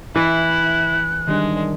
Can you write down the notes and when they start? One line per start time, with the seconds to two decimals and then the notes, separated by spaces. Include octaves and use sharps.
0.16 E3 E4 F#6
1.28 D#3 G3 G#3 D4